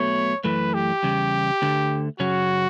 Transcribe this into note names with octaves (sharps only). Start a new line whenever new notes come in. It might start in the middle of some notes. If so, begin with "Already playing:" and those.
Already playing: B1 B2 A3 C#5
F#2 E3 A3 B4
G4
E2 C#3 G3
D2 D3 A3
F#2 C#3 F#3 C#4 F#4